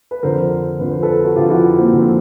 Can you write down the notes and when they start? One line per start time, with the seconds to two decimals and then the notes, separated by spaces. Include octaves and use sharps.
0.11 B4
0.23 F2 D3 F3 A#4 C5
0.80 F2 D3 F3 B4
0.90 C5
1.02 A4 B4
1.24 F#4
1.36 F2 D3 F3 F4 G4
1.50 E4 F#4
1.78 A#3 C4
1.92 F2 D3 F3